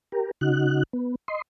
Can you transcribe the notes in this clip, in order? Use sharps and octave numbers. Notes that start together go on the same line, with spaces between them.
G4 A#4
C#3 D#4 F#4 F#6
B3
D#5 C6